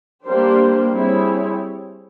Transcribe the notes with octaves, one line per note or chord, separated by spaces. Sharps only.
G3 A#3 D4 G4 C5
G3 C4 E4 G#4 C#5